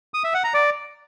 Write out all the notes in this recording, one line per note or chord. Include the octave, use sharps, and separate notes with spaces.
D#6
E5
F#5
A#5
D5